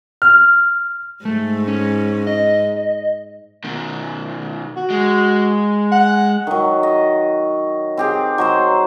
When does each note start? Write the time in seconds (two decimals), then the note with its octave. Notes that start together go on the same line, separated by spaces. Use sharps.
0.22 F6
1.25 G#2 A3
1.67 C#4
2.27 D#5
3.64 B2 D#3
4.76 F#4
4.90 G#3
5.92 F#5
6.47 D#3 F#3
6.83 D#5
7.97 C4 G4 G#4
8.38 F#3 D#4 C5